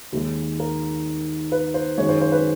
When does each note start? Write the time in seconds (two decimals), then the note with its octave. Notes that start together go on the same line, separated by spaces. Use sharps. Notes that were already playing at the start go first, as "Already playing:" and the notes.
0.12 D#2 D#3 G#3
0.60 A#4
1.52 B4
1.74 C5
1.98 F#2 D#3 G#3 C#5
2.09 C5
2.21 C5
2.32 B4